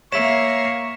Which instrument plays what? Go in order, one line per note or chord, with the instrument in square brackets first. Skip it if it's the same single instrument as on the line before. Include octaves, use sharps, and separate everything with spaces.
[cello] A#3 [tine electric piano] C#5 E5 [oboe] C#6 [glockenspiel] B6 E7